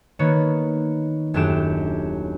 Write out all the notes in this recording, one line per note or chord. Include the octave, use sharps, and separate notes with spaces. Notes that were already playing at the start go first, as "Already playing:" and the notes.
D#3 A#3 B3 C#5
D#1 F#2 A3 D4 G4 E7